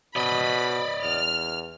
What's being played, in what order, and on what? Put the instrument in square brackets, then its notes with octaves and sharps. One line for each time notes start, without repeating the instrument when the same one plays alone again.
[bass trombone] B2 [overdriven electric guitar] D5 D#5 [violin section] B5
[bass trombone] E2 [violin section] F6